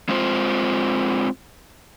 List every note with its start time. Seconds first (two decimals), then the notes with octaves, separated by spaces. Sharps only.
0.09 G#3 C4 F4 C5